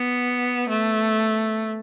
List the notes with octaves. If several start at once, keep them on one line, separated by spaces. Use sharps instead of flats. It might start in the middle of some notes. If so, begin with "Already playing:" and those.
Already playing: B3
A3